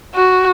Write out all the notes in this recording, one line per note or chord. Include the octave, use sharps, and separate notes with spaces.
F#4